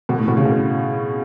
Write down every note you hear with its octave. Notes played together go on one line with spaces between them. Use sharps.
B2
A2
B2
C#3
B2